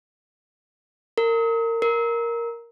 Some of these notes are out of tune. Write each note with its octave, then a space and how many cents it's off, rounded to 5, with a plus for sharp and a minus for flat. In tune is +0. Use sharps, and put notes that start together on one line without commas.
A#4 -25
A#4 +5